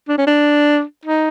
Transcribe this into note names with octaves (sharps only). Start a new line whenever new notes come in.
D4
C#4
D4
D#4